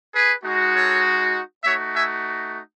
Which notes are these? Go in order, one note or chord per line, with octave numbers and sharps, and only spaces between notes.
G#4 B4
G#3 D#4 F#4
A4 C#5
A3 D#4 F#4 C#5 E5
E5 G#5